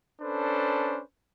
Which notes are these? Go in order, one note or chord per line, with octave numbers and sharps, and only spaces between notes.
C#4 D4 A4 B4 C5